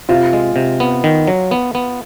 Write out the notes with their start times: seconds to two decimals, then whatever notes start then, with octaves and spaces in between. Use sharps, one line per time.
0.09 C3 F4
0.33 G#3
0.56 C3
0.80 B3
1.04 D#3
1.28 F#3
1.51 B3
1.75 B3